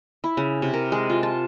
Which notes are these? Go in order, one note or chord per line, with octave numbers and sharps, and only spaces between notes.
E4
C#3
C3
A#4
G#3
F4
A5